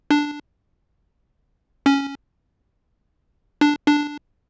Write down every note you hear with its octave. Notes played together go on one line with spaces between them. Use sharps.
D4
C#4
D4
D4